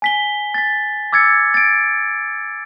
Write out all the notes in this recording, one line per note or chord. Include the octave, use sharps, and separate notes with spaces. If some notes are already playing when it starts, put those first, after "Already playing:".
G#5 B6 G7
A6 B6
D6 E6 G#6 A6 C#7
A6 D7